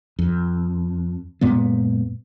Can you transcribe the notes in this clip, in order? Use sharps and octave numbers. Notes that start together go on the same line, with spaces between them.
F2
F#2 A#2 G#3 B3